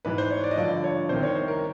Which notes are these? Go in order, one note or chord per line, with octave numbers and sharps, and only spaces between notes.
G#2 E3 B4
C5
C#5
D5
D#5
G2 D3 F3 D5
C#5
C2 C3 D#3 C5
C#5
C5
A#4